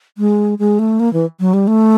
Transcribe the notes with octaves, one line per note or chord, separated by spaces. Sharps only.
G#3
G#3
A3
A#3
E3
F#3
G3
A3